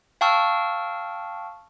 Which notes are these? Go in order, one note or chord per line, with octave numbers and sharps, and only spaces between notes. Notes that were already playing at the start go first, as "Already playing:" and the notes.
F5 G5 A5 C#6 E6 F6